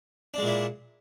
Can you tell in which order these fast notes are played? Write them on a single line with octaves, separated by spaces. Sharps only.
D4 G#3 A#2 E4